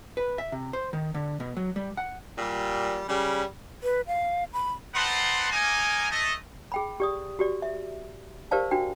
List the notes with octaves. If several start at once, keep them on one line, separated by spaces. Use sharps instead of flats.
B4
E5
C3
C5
D#3
D3
B2
F#3
G3
F#5
A#2 G3
C#3 G3
B4
F5
B5
C4 D#4 B4 F#5 A5 C6
A#3 D#4 G#5
A3 D#5
G#4 G5 B5
G4 D5 D#6
F#4 G4 D5
E5
G4 A#4 C5 D5 F5 A5
D4 F#4 G5